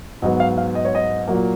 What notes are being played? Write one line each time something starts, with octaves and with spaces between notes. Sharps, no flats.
G#2 F#3 B3 D#5
F5
F5
D#5
C#5
D#5
A#2 F#3 A#3